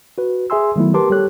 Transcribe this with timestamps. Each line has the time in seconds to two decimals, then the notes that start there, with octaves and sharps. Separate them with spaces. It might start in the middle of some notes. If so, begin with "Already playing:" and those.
0.18 F#4 B4
0.50 G#4 E5 G#5 C6 E6
0.76 D#3 F#3 A3 B3 E4
0.94 G4 A#4 B4 A5 C6 D6
1.10 G3 G4 A4 C#5 F#6